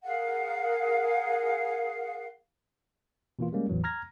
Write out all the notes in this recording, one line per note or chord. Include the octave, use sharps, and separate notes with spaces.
G#4 A#4 F5 F#5
B2 E3 A#3 F4
G3 G#3 A#3 C#4
G#1 E2 A2 E3 F#3
A#5 F6 G#6 A#6